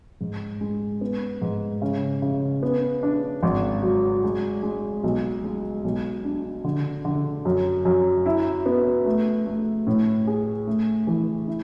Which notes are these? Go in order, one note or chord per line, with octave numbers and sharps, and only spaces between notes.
G#2
G#3
B3
G#2
C#3
C#3
B3
D4
G#1
F#3
G#3
G#3
B1
G#3
B1
D4
D3
D3
F#2
F#2
E4
B3
A3
A3
A2
G#4
A3
E3
E4